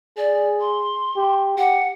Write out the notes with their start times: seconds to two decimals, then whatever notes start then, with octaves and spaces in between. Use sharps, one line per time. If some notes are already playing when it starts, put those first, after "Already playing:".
0.17 G#4 D5
0.60 C6
1.16 G4
1.58 G4 F#5